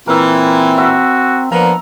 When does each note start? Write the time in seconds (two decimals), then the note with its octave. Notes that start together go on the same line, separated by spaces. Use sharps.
0.07 A#2 E3 C4 A#4 E5
0.78 F#4 E5
1.52 F3 A#3 B3 D4 A#5